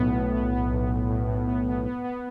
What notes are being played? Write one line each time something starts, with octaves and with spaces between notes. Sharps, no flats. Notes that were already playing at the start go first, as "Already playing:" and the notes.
Already playing: B1 A2 B3
A2
B3
B3
B1
B1
A2
A2
B3
B3
B3
B3